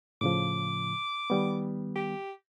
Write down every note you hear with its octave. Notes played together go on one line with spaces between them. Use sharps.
A2 C#3 F3 D6
D#3 G3 B3
G4